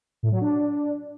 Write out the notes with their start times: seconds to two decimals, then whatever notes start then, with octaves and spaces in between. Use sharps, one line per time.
0.23 A2
0.32 F#3
0.41 D4